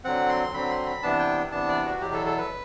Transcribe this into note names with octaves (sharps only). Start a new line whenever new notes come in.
D3 F#3 C4 F#5
C6
D3 F#3 C4 B5
C6
B5
C3 E3 B3 D4 A5
G5
C3 E3 B3 D4 A5
D5
F#4
E2 B2 F#3 G4
A4
A4
B4